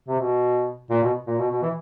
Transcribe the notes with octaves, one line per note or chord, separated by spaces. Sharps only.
C3
B2
A#2
B2
A#2
B2
B2
E3